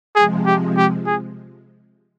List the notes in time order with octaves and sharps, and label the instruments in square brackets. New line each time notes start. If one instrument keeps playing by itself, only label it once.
[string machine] C3 F3 G#3 [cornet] G#4
[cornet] G4
G4
G#4